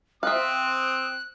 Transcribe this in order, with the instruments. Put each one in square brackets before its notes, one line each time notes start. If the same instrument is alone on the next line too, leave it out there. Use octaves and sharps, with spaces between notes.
[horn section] C4 [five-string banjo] E5 F5 [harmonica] D#6 [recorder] F#6